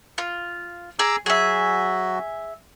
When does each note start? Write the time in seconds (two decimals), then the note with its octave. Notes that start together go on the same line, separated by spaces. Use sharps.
0.18 F4
0.99 G#4 A#5 D6 E6
1.26 F#3 F#4 G#4 E5